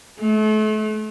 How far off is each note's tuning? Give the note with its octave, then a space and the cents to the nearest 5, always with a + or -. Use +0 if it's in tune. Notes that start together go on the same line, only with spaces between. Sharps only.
A3 -35